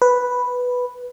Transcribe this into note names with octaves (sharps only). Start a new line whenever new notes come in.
B4